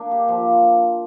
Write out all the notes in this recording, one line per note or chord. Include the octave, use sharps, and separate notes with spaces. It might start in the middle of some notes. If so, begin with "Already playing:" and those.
Already playing: A#3 D4
G4
F3